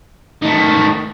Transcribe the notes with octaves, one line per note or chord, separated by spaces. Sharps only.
D#3 A3